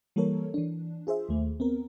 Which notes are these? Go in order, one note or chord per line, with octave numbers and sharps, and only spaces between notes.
E3 G3 A#3 A4 A#4 C#5
E3 D4
F4 G#4 C5 E5
D#2 A3
B3 C4 A#4